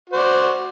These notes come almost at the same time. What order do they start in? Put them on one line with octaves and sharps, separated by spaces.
F#4 C5 D5